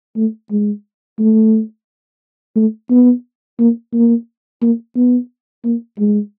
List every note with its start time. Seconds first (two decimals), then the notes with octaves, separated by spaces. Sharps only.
0.17 A3
0.51 G#3
1.19 A3
2.56 A3
2.90 B3
3.59 A#3
3.93 A#3
4.62 A#3
4.96 B3
5.65 A#3
5.99 G#3